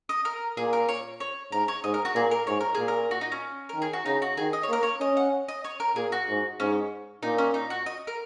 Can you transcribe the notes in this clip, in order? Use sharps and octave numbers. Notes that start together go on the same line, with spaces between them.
D#5
A#4
A#2 G#4
A#4
C#5
C#5
G#2 A#4
C#5
G#2 D#5
A#4
F#4
A#2 G#4
A#4
G#2 C#5
A#4
A#2 G#4
A#4
F#4
D#4
C#4
A#4
D#3
G#4
F#4
C#3 D#4
F#4
D#3 G#4
D#5
C#5
A#3 A#4
C#5
C#4 D#5
F#5
D#5
C#5
A#4
A#2 G#4
F#4
G#2
G#2 C#4
A#2 D#4
C#4
D#4
F#4
D#5
A#4